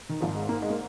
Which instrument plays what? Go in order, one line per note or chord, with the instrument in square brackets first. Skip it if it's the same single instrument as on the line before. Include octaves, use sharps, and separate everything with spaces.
[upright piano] D#3
[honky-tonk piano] G#1 G#2 D#3 [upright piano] F3
[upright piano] G#3
A#3
G#3
A#3